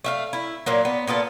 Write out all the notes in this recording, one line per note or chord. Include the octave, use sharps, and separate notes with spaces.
A3 E5 F5
E4
A#2 F#3 A#3
B3
A#2 B3 F4 A4